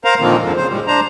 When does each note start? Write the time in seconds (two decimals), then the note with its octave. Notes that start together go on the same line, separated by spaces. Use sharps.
0.05 A#4 C5 F5 A#5
0.20 A#2 D3 D#3 F3 A#3 C4
0.42 F2 G#2 D3 F3
0.57 C#3 C5
0.69 A2 G3 G#3
0.87 D4 C5 A#5